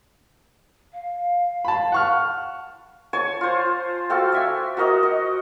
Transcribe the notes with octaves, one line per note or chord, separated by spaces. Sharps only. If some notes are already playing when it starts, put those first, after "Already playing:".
F5
A5 B5
F#5 C#6 F6
C#5 G#5 A5
F4 C5
F#4 A4 F5 G5
D5 E5 G#5
F#4 A#4 D#5 D6
D#5